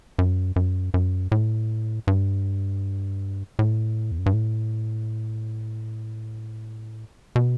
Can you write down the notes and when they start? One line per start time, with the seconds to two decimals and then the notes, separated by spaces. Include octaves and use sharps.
0.19 F#2
0.56 F#2
0.94 F#2
1.32 A2
2.07 G2
3.59 A2
4.11 E2
4.18 F#2
4.26 G2
4.33 A2
7.36 B2